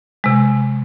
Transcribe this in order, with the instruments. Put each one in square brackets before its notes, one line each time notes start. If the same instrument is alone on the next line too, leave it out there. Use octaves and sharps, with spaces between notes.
[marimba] C3 G#3